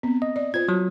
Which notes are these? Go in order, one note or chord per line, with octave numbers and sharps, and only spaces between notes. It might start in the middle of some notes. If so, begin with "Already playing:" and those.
B3 C4
D#5
D5
F4 C5 G#6
F#3